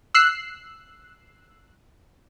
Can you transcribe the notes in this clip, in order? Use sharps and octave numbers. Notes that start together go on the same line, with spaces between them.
E6 F#6 C7